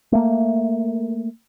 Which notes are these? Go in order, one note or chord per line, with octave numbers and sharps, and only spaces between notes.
A3 A#3